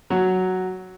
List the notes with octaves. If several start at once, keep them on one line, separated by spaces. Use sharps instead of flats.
F#3